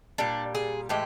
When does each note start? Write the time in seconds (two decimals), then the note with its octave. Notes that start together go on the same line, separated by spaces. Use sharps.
0.18 A#2 G3 D4
0.55 G#4
0.89 A2 E3 G#3 G4